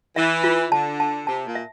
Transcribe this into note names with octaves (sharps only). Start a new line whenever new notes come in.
E3 E5
F4
D3 A5
A5
C3 A5
A#2
E5